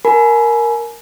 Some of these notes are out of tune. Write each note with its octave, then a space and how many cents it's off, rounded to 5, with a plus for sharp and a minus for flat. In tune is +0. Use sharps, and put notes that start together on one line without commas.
A#4 +0 G#5 +30 B5 -25